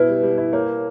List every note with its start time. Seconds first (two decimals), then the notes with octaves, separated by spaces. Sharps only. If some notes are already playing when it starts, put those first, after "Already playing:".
Already playing: B2 E4 B4
0.08 G3
0.23 G3
0.38 E4
0.53 A#3 C#5